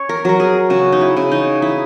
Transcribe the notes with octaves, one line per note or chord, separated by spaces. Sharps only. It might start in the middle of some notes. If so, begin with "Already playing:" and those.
Already playing: C#4 C#5
A#4
F#3 A#4
G#4
C#3 F#4
D#4
E4
C#3
D#4
D#4 E4